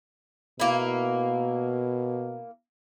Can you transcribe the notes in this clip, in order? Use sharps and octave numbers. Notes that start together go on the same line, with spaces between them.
B2 A#3 E4